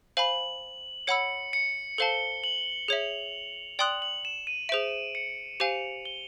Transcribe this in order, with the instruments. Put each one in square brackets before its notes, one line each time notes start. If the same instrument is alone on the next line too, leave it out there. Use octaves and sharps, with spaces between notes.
[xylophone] C5 F5 G#5 B5 [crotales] F#7
[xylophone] C#5 F#5 B5 E6 [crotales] C#7
[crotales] C#7
[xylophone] A4 C5 F5 A5 [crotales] G7
[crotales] F#7
[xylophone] G#4 C#5 E5 [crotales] F7
[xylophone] D5 G5 C6 D#6 F#6 [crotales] F#7
[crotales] F#7
E7
D#7
[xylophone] G#4 C5 E5 [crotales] D7
[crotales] C#7
[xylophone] G4 C5 F5 G#5 [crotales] F7
[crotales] G7